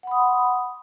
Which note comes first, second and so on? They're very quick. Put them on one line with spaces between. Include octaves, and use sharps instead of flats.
F#5 B5 D#6 C6